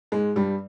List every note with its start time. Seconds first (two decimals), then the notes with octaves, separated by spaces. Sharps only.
0.12 G#2 G#3
0.36 G2 G3